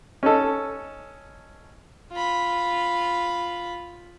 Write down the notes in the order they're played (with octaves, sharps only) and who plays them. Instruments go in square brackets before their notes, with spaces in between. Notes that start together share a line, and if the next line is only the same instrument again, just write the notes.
[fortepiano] C#4 D#4 A4
[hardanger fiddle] F4 B5